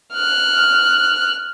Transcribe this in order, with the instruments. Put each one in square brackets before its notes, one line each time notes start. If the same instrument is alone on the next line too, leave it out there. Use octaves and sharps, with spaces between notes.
[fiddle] F6 F#6